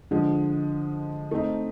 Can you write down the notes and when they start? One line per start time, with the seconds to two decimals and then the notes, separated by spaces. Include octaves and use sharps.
0.11 D3 F3 G#3
1.31 A3 C4 D#4